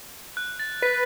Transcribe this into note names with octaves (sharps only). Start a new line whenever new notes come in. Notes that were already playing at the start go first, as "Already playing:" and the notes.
F#6
A6
B4 B6